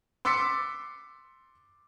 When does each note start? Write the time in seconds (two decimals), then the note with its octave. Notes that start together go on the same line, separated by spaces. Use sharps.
0.25 C6 D6 E6 A6 B6 C#7